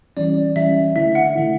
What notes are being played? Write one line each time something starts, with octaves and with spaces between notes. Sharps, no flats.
E3 G3 C#4 D5
E3 G3 C#4 E5
D3 A3 E4 E5
F#5
D3 A3 E4